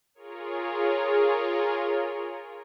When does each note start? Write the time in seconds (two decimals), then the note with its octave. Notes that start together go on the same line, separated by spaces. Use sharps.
0.15 F4 G#4 A#4 C#5